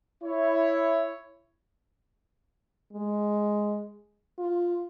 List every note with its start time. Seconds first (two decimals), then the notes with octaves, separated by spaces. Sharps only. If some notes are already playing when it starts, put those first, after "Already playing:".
0.24 E4 C#5
2.93 G#3
4.39 F4